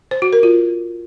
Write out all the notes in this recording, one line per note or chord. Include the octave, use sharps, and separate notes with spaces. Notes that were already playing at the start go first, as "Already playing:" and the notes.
C5
F#4
A#4
F4